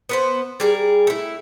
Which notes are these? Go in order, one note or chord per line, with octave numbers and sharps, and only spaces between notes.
B3 B4 C5
G3 G#4 A#4
A3 E4